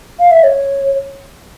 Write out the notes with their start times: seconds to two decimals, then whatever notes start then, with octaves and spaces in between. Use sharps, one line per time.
0.19 F5
0.31 E5
0.44 C#5